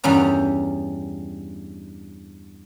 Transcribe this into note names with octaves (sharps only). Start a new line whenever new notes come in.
E2 G2 G3 C#4 A#5